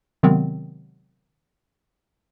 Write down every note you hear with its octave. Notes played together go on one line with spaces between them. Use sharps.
C3 D#3 F#3 G#3 B3 C4